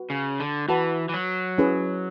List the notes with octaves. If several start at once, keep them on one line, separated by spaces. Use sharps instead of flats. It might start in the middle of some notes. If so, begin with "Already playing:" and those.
Already playing: F#4 B4 F#5
C#3
D3
E3 F#4 B4 F#5 A5
E3
F#3
C#4 E4 G#4 B4